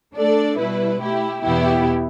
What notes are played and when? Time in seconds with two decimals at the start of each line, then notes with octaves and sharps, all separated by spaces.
0.15 A3 D4 A4 D5
0.58 B2 G3 E4 B4
1.01 A3 E4 G4
1.43 E2 B2 B3 E4 G4